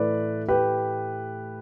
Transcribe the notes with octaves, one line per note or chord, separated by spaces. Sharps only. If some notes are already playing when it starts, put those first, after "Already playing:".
Already playing: A2 E3 A3 B4 D5
G4 B4